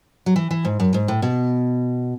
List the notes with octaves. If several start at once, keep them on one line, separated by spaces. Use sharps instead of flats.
F#3
E3
E3
G#2
F#2
G#2
A2
B2